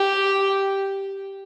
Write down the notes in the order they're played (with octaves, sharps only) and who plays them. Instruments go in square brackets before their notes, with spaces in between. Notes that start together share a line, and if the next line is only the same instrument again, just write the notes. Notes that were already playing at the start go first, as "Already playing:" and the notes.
Already playing: [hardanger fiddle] G4